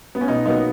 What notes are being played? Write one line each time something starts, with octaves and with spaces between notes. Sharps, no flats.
B3
C#4
B2 B3 D#4
F#3 A#3 B3 D#4